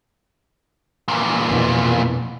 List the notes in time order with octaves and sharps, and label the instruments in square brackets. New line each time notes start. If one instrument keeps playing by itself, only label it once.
[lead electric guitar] E2 A#2
[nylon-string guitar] F2 B2 E4